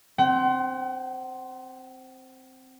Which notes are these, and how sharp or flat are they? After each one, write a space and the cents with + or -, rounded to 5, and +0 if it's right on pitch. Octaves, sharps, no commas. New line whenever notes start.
C4 +0 F#5 +40